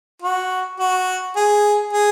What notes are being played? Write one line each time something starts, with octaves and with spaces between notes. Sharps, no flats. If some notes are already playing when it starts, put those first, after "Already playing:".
F#4
F#4
G#4
G#4